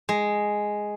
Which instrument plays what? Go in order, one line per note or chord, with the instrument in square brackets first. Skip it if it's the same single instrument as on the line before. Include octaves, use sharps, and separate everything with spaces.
[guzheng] G#3